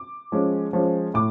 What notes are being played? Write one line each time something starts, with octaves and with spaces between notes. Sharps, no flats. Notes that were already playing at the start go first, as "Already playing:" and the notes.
Already playing: D6
F3 G#3 C#4
F3 G#3 C#4
A2 D6